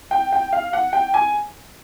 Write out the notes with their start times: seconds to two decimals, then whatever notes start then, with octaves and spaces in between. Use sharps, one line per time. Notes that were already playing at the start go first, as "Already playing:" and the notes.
0.11 G5
0.32 G5
0.53 F5
0.73 F#5
0.93 G5
1.14 G#5